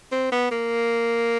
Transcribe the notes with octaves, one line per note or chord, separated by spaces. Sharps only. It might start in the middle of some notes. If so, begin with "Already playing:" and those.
C4
B3
A#3